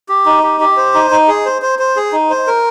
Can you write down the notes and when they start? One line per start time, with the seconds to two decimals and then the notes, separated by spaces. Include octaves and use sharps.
0.09 G4
0.26 D#4
0.43 G4
0.60 G4
0.77 C5
0.94 D#4
1.11 D#4
1.28 G#4
1.45 C5
1.62 C5
1.79 C5
1.96 G#4
2.12 D#4
2.30 C5
2.47 A#4